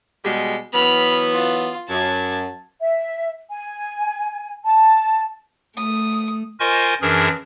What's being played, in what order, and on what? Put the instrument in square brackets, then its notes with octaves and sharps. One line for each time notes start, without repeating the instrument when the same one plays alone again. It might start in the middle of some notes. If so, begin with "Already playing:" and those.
[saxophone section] B2 G3 G#3
[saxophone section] E3 F#3 B3 [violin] B5 F6
[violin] F4
[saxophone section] F#2 [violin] A5 G#6
[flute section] E5
G#5
A5
[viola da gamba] A3 [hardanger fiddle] D#6
[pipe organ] F4 A#4 C5 D#5 G#5 C#6
F#2 E3 D4 G#4 A#4